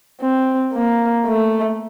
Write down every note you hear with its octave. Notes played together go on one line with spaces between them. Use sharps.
C4
A#3
A3